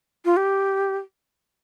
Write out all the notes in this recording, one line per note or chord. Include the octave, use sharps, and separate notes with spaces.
F4
G4